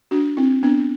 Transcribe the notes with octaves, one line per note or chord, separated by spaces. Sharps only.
D4 F#4
C4 E4
B3 D4